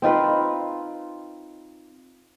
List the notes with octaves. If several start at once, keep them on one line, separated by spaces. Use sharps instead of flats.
C4 D#4 F4 B4